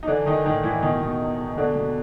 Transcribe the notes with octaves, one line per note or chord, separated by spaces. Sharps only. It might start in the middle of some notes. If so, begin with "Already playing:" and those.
D#4
D3 E3 D4
D#3 E3 D#4
A2 D#3 D#4
A2 E3 E4
B2 D#3 D#4
B2
E2
E2
B2 D3 D4
B2